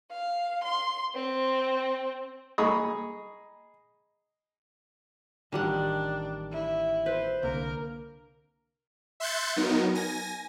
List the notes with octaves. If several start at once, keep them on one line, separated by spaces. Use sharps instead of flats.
F5
C6
C4
G#4 D#5 A#5 B5 C#6 D#6
A1 D#3 G3 D4 F#5
E4
B4 C5
C2 D3 A#3 A#4
E5 C6 F#6 G6 A6 C#7
F#3 B3 D#4 A#4
G#5 A#6